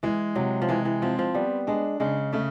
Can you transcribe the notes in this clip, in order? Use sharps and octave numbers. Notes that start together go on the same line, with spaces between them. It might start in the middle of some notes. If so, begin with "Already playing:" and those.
E3 G#3
C3 F#3
F3
E3 G#3
E3
F3 C4
F3
G3 B3
G#3 D4
C#3 G#3
C#3 A3